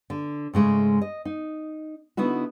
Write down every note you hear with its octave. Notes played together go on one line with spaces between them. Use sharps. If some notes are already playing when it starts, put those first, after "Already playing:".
D3
G#2 C#3 G#3 A3
D#5
D#4
D3 B3 D#4 E4 F#4